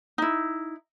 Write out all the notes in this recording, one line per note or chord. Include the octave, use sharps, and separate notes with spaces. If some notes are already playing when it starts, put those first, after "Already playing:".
D#4 E4